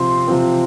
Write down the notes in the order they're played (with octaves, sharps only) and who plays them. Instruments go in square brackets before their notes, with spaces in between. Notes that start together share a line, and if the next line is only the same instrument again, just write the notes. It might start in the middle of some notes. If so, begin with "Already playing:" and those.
Already playing: [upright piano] C3 F3 C4 [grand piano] C6
[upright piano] C3 F3 C4